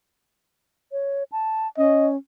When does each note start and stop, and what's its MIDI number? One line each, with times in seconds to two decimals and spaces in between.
0.92 1.23 73
1.32 1.67 81
1.77 2.16 61
1.77 2.08 75